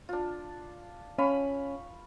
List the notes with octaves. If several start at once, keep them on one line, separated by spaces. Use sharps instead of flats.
D4 F4
C#4 F5 B5 C#6